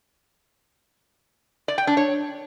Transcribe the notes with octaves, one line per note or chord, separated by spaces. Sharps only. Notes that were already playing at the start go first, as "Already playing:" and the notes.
D5
G5
D4
C#5